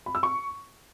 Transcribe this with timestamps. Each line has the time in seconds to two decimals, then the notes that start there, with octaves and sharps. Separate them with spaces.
0.06 B5
0.15 E6
0.23 C#6